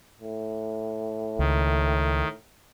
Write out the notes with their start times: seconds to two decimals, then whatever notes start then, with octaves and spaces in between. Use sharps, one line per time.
0.21 A2
1.39 C#2 D#3